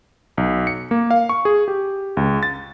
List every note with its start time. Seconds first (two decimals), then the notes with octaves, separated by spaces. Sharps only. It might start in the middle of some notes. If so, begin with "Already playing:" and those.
0.38 B1
0.67 C#7
0.91 A#3
1.11 F5
1.29 C#6
1.45 G#4
1.68 G4
2.17 C#2
2.43 A6